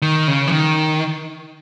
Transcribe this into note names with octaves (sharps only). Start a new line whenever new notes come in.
D#3
C#3
E3
D#3